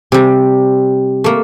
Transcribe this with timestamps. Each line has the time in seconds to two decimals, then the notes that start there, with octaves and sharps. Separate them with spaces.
0.12 C3 G3
1.24 A3 A#3